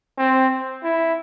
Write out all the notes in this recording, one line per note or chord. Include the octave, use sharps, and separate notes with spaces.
C4
E4